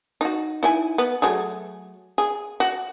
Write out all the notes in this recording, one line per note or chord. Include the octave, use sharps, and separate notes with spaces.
D#4 F#4
D#4 E4 G#5
B3
F#3 A3 G#4
G#4
F#4